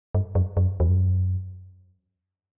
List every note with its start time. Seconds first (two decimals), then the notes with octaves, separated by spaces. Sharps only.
0.15 G2
0.35 F#2
0.57 F#2
0.80 E2
0.89 F#2